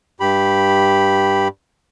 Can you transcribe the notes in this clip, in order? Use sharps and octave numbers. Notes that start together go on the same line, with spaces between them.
G2 G4 B5